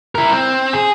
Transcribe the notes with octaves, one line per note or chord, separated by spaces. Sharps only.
E4 A#4
C4
G#4